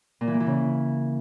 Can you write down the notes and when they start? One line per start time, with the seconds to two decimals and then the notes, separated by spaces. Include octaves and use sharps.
0.21 A#2
0.27 E3
0.34 A#3
0.40 E3
0.47 C#3